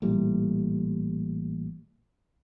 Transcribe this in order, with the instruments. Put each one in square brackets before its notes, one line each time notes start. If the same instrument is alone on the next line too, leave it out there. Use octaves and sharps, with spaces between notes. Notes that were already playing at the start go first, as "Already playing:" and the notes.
[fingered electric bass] A1 A#2 G3